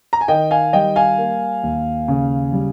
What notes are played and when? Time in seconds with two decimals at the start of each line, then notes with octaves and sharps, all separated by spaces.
0.13 A#5
0.21 G#5
0.28 D#3 D#5 G5
0.51 F5 G#5
0.73 G3 D#5 G5
0.96 F5 G#5
1.18 A#3
1.63 D#2
2.08 C#3
2.53 G3